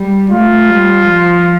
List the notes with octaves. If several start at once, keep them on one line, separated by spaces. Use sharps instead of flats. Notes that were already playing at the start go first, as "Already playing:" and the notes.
Already playing: G3
A3 F4
G3
F3